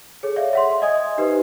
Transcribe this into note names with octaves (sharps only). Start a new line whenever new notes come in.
G#4 A4 C#5
C#5 D5 E5 F5
E5 F#5 C6
D#5 G#5 D#6 G#6
D#4 G4 B4 C5